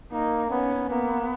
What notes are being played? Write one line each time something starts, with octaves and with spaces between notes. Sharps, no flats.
A#3 D#4
B3 C#4
A#3 B3